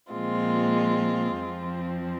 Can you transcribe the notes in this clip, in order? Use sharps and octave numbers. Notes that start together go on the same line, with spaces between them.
A#2 F3 G#3 C4 F4
F2 F3 C4